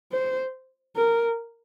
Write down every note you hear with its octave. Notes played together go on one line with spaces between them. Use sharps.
C5
A#4